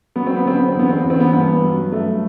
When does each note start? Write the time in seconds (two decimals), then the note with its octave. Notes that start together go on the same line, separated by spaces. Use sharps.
0.16 F#3 B3
0.26 C4
0.37 B3
0.45 D3 C4
0.58 B3
0.68 C4
0.74 E2
0.79 B3
0.89 C4
0.99 E2 B3
1.10 C4
1.20 B3
1.33 G2 B3
1.63 F#3
1.92 G2 A3